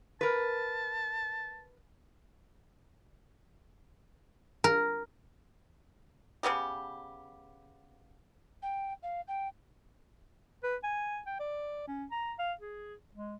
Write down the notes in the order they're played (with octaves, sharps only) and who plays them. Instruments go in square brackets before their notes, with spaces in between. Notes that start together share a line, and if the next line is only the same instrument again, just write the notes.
[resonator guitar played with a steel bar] A#4 B4 [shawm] A5
[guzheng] A#4
[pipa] C#3 F#3 B3 G4
[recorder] G5
F5
G5
[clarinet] B4
G#5
G5
D5
C#4
A#5
F5
G#4
G#3